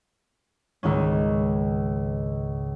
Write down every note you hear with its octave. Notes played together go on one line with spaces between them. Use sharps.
C#2 G#2 D#3 C#4